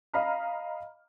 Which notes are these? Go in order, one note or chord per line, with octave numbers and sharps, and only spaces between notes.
D#5 F5 A#5 B5 F6